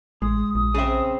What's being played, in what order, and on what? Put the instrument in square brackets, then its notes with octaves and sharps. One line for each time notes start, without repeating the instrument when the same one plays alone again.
[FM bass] A1 [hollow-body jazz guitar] G#3 [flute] D#6
[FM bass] A#1 [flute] D#6
[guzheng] C#3 C4 [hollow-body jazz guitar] G#4 E5